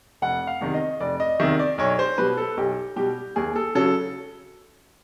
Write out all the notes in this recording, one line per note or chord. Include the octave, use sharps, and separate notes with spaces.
F1 F#5
F5
E2 C3 D#3
D#5
F1 D5
D#5
E2 C3 D#3 E5
D5
B1 C#5
C5
B2 G3 B4
A4
B1 G4
B2 G3 G4
D#2 G#4
A4
C#3 F#3 A4